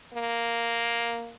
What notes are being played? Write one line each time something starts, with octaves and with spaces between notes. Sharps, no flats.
A#3